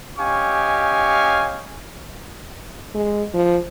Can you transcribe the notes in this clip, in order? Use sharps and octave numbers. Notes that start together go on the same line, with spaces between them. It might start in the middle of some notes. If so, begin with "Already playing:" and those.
C#4 G4 D#5 F5 G#5 C#6
G#3
F3